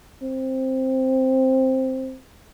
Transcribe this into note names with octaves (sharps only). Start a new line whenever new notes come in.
C4